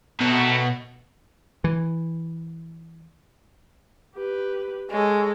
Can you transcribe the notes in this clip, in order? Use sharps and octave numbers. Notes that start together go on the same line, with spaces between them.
B2 D#3 F#3 A3
E3
G4 B4
G#3 A4 C#5